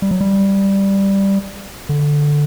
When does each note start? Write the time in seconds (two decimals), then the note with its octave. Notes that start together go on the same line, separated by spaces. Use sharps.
0.02 G3
0.11 F#3
0.21 G3
1.89 D3